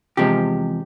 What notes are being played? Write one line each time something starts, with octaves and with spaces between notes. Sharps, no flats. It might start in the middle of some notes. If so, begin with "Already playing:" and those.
E2 C3 F3 G#3 G4